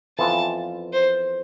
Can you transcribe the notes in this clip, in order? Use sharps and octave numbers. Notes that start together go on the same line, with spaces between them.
F2 E3 B3 F4 A5
C5